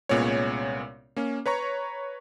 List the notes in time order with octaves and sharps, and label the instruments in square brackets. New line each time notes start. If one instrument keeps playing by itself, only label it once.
[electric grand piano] C2 A#2 G#3 B3 C#4 C#5
A#3 C#4
B4 C#5 A#5 C#6